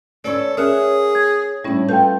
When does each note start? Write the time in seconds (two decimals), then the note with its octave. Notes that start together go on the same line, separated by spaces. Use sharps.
0.24 C#4 A4 B4 C#5 D5
0.57 C#4 G#4 A#4 C#5 E5 F6 F#6
1.15 G#6
1.64 A2 G3 C#4 D4 E4
1.89 A3 F4 A4 B4 G5 A5 G6